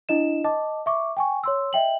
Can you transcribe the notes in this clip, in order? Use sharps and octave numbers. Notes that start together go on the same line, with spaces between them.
D4 E4 D#5 E7
D#5 A5 D6
E5 C#6 D6
G5 G#5 C#6
C#5 C6 E6
D#5 E5 G5 F#7